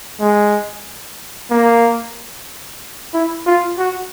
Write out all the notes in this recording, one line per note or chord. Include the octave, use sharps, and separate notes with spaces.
G#3
A#3
E4
F4
F#4